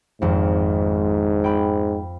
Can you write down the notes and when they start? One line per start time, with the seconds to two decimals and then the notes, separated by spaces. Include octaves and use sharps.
0.22 G#1 F2 G#2
1.44 G5 B5